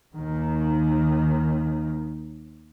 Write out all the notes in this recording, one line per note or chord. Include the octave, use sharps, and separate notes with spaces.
D#2 D#3